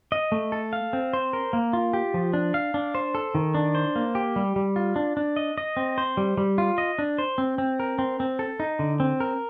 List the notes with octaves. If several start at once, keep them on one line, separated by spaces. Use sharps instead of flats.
D#5
A3
A4
F5
C4
C5
A#4
A#3
F4
G4
F3
D4
F5
D4
C5
A4
D#3
D4
C5
A#3
G4
G3
G3
F4
D4
D4
D#5
D#5
C4
C5
G3
G3
F4
D#5
D4
C5
C4
C4
A#4
C4
C4
A4
D#4
D3
C4
A#4